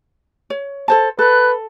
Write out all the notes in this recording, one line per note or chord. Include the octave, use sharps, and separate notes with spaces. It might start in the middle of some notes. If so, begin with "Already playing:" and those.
C#5
A4 C5 A5
A4 B4 F#6